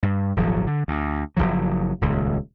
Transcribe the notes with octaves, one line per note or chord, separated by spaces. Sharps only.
G2
D#1 G#1 F3 F#3
D3
D2
F#1 D#2 F3 F#3
D#1 C#2